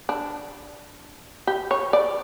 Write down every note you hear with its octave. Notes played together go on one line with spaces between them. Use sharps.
D4
G4
C#5
D5